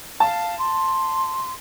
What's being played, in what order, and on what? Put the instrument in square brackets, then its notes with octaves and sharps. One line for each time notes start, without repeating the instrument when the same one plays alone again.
[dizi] F5 [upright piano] A5
[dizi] C6